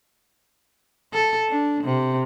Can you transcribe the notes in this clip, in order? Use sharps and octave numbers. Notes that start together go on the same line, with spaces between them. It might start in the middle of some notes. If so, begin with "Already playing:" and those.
A4
D4
C3